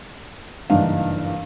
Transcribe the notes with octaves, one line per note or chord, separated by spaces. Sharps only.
F#1 G2 E3 D4 D#4 F5